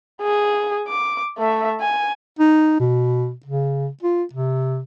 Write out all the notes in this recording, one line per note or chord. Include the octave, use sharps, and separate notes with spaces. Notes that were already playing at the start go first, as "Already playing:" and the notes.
G#4
D6
A3 E5
G#5
D#4
B2
C#3
F4
C3